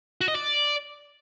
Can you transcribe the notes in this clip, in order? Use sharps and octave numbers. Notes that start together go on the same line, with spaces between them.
F#4
D#5
D5